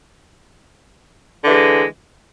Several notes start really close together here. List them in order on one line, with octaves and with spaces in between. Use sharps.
D3 E3 G#3